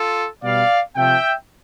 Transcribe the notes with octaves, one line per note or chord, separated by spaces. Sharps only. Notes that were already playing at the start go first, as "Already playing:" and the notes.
Already playing: F4 A4
B2 G3 D5 F5
C3 F3 A3 E5 G5